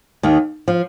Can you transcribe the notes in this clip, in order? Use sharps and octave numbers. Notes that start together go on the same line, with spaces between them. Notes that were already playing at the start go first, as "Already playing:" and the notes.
D#2 D#3
F3